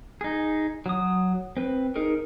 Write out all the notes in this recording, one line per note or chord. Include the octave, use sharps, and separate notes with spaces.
D#4 G#4
F#3 D#6
C4 B4
D#4 G#4 A#4